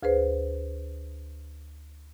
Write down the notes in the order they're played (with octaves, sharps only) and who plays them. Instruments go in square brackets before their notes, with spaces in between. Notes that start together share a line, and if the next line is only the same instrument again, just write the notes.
[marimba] D2 G#4 B4 C5